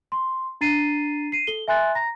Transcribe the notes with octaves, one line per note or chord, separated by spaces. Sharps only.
C6
D4 A#5 A6 C7 D#7
C7 D#7
A4 G7
E5 G#5 C6 F#6 A6
A#5 A#6